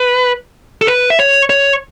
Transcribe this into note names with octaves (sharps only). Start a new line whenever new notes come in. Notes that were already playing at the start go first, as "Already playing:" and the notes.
Already playing: B4
A4
B4
E5
C#5
C#5